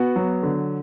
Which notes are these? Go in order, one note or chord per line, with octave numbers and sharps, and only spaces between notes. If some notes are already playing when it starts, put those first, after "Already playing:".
Already playing: B3 F#4
F#3
D3